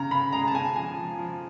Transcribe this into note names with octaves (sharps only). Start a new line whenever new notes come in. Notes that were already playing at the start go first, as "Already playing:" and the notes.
Already playing: C#3 A#5
C#3 B5
G#3 A#5
A5
C#3 G#5
F3 G#5
F3
F3